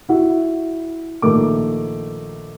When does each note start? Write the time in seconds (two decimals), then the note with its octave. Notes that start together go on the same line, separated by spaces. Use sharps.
0.09 E4 F#4
1.22 A#1 D#3 A3 D6